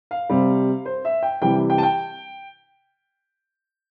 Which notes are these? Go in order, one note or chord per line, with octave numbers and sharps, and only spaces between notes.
F5
C3 G3 C4
C5
E5
G5
C3 E3 G3 G5
G5
A5
G5